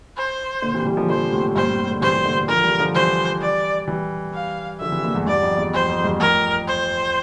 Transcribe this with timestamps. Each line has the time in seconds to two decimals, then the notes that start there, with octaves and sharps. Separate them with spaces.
0.17 C5
0.62 A#2 D3
0.74 C3 E3
0.85 E3 G3
0.97 D3 F3
1.09 D3 F3 C5
1.32 A2 C3
1.56 G2 A#2 C5
1.67 A2 C3
1.79 A2 C3
1.91 A#2 D3
2.01 C3 E3 C5
2.13 C3 E3
2.25 A#2 D3
2.37 A#2 D3
2.48 D3 F3 A#4
2.64 E3 G3
2.79 D3 F3
2.95 E3 G3 C5
3.41 D5
3.87 E3 G3
4.34 F5
4.80 D3 F3 E5
4.92 C3 E3
5.04 A#2 D3
5.15 E2 G2
5.27 E2 G2 D5
5.43 F2
5.58 E2
5.73 F2 C5
5.89 F2
6.04 E2 G2
6.19 F2 A2 A#4
6.67 C5